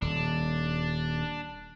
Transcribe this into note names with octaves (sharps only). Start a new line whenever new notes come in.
D#1 D4